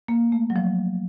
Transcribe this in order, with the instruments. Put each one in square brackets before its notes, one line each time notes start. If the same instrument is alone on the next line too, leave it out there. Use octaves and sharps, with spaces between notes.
[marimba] A#3
A3
F#3
F3